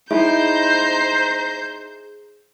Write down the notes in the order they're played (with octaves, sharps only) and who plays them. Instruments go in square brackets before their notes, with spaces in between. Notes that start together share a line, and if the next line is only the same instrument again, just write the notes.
[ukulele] D#4 E4 [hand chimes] G#4 [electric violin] C5 G6 [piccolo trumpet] A#5